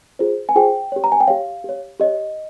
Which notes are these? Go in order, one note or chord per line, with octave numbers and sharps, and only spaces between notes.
F4 G#4 C5
G#5
F4 G#4 C5 G5
G4 C#5
A#5
G#5
G5
G4 C#5 F5
G4 C#5
G4 C#5 D#5